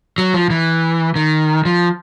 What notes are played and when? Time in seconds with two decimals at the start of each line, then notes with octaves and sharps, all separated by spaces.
0.18 F#3
0.34 F3
0.50 E3
1.16 D#3
1.65 F3